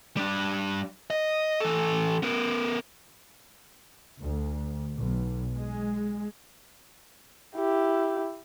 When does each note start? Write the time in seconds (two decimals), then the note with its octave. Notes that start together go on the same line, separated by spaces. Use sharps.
0.17 G3 D4
1.10 D#5
1.60 E3 A4
2.23 B3 A#4
4.20 D2
4.97 B1
5.55 G#3
7.55 E4 G4